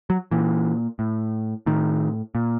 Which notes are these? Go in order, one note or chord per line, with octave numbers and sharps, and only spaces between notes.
F#3
A#2 E3
A2
A2 D#3
A#2